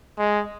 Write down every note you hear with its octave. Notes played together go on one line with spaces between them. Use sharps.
G#3